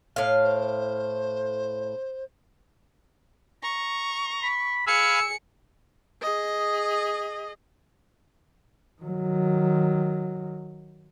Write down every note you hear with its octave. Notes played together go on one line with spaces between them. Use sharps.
A2 F5
C5
A#5 C#6
B5
G#4 F5 G#5 B5 E6 C#7
G#4 D#5
D#3 F#3